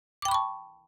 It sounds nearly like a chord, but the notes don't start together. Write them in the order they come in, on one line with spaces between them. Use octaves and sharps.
D6 G5 B5 C#6 A5